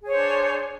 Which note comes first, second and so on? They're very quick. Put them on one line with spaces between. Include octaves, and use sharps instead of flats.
G#4 C#5 C5 D4